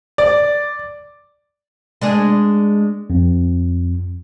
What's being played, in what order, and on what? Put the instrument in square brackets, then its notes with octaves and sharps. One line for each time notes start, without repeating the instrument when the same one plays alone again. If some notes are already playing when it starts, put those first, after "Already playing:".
[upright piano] D5
[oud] G#3 D4 G#4
[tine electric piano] F2